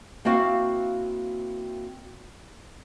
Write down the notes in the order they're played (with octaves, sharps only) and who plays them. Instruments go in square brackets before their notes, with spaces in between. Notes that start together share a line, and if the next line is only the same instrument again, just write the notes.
[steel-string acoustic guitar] A#3 C4 E4 F#4 F5